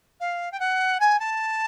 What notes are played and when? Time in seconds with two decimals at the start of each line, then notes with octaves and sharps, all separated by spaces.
0.20 F5
0.51 G5
0.59 F#5
1.00 G#5
1.19 A5